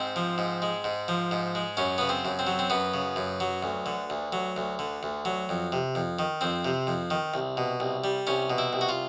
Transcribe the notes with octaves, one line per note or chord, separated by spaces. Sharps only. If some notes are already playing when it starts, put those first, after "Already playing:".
Already playing: G#2 C4
F3
G#2
G#3
G#2
F3
G#2
G#3
F#2 C#4
C#3 B3
C4
F#2
C4
F#3
C4
F#2 B3
C#3
F#2
F#3
D2
D3
D2
F#3
D2
D3
D2
F#3
F2
C3
F2
D#3
F2 C4
C3
F2
D#3
C2
B2
C2
G3
C2 C#4
B2
E4
C2
F#4
F4